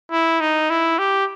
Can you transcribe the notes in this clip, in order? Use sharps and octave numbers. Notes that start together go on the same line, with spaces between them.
E4
D#4
E4
G4